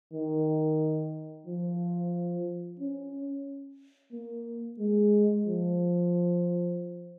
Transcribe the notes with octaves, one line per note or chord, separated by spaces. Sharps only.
D#3
F3
C#4
A#3
G#3
F3